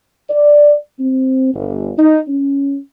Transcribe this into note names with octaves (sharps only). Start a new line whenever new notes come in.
D5
C4
G1
D#4
C#4